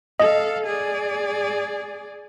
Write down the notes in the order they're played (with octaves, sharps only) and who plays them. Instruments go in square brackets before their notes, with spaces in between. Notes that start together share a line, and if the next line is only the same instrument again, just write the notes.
[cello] A4 F5 [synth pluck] D#5
[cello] G#4 D5